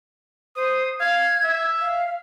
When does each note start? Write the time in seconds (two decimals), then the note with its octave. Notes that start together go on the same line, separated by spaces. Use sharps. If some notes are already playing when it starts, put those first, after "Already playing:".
0.56 C5 D#6
1.00 F5 G#6
1.44 E5
1.81 F5